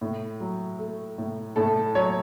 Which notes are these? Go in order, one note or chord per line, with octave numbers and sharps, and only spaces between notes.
A2
F#3
A3
A2
A2 A4
F#3 C#5